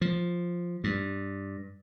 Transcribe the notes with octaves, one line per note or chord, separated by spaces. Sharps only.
F3
G2